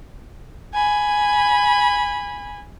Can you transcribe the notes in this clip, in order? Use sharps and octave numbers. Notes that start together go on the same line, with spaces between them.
G#5 B5